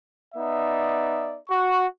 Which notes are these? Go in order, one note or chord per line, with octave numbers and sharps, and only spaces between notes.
B3 D#4 D5 E5
F#4 C#6